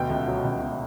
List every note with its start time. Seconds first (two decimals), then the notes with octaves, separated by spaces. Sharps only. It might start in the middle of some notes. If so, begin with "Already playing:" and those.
Already playing: D2 B2 G5
0.10 C#2
0.28 F#3
0.44 C#2
0.61 B2